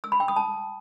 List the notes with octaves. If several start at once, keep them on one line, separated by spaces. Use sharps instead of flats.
E6
B5
G5
D#6
A5